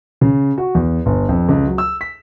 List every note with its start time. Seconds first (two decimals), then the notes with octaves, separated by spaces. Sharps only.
0.21 C#3
0.58 F#4
0.75 E2
1.06 G1
1.29 F2
1.49 C#2
1.67 F#3
1.78 E6
2.01 B6